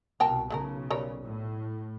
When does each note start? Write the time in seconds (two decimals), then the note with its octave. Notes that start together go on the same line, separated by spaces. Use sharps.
0.20 C2 B2 A#4 G5 A5
0.50 B1 C#3 A3 A4 A#4
0.91 G3 A#4 C#5
1.23 A2